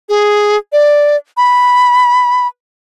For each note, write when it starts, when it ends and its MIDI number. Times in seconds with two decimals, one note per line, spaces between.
0.09 0.57 68
0.72 1.16 74
1.37 2.47 83